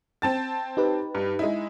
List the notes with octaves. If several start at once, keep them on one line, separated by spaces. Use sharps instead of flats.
C4 A5 A6
D#4 G4 B4
G2
G#3 D#4 E4